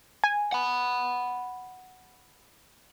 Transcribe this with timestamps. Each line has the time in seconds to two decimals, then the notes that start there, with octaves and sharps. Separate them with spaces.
0.24 G#5
0.52 F#5 B5